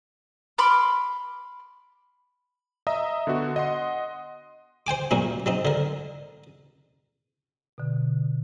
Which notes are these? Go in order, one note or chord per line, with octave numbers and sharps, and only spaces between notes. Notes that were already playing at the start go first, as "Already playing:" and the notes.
B5 C6 D6 F6
D#5 E5 A#5 D#6
D3 B3 F#4
D#5 F#5 C6
C5 G5 G#5 D6
F#2 A#2 A#3 C#4
F#3 C4 D#4
D3 A#4
B2 D3